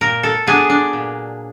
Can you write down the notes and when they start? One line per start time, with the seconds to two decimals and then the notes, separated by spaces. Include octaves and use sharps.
0.01 A#2 A#4
0.23 A4
0.47 F#3 B3 D4 G#4
0.70 D4
0.93 A#2